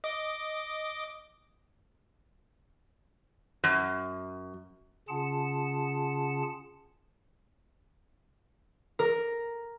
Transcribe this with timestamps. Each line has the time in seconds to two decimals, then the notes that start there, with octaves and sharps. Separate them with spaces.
0.04 D#5 D6
3.64 F#2
5.09 C#3 C#4 F4 G#4 F#5 A5
8.99 A#4